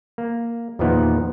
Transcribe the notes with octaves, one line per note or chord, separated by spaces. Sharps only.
A#3
E2 A#2 D#3 F3 B3 D#4